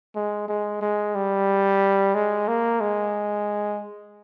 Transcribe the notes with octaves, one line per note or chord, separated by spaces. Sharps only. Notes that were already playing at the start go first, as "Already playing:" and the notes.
G#3
G#3
G#3
G3
G#3
A#3
G#3